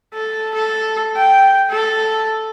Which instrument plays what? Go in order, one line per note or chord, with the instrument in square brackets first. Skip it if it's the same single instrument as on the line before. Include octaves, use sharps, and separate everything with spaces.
[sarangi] A4
A4
G5
A4